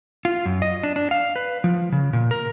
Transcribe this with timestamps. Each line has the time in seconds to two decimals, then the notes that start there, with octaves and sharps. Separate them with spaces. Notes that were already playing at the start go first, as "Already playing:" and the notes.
0.25 F4
0.45 F#2
0.62 D#5
0.83 D4
0.96 D4
1.11 F5
1.36 B4
1.64 F3
1.92 C#3
2.13 A#2
2.31 A#4